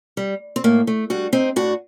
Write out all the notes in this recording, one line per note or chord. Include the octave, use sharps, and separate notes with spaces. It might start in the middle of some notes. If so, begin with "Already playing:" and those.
G3
C4
A2 A#3
A3
G3 D4 F#4
C4 D#4
A2 D4 F#4